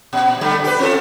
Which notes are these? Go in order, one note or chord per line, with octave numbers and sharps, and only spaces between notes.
A#2
D3 G3 A3
G4 B4
C4 F4 A4